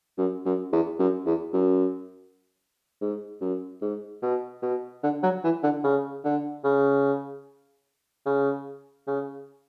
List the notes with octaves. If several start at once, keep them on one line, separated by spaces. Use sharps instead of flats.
F#2
F#2
E2
F#2
E2
F#2
G#2
F#2
G#2
B2
B2
D3
F#3
E3
D3
C#3
D3
C#3
C#3
C#3